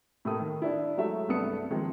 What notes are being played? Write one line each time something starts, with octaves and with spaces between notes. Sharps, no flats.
A2 A3 A#3 D#6
D#3
D4 E4
F#3 G#3 A3 E5
C2 G2 A3 B3 D#6 C#7
D#3 F3 G#3 A#3 C4 D#4